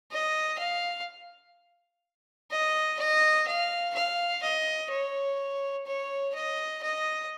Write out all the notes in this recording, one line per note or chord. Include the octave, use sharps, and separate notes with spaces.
D#5
F5
D#5
D#5
F5
F5
D#5
C#5
C#5
D#5
D#5